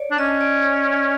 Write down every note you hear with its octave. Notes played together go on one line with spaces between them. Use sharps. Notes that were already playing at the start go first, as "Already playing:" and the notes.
Already playing: C#5 D5
D4
C#4 D#5
D5
C#5
D5